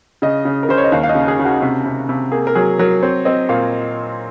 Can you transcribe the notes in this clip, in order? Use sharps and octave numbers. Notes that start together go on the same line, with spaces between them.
C#3 D#5
C#3
A#4
C#3 C5
C#5
D#5
D#2 F5
F5
D#5
C#3
G#4
C#3
F#4
C3
C3
C3
A#3 G#4
A#4
F#3 G#4
F#3 A#4
C4 C#5
C4 D#5
A#2 F5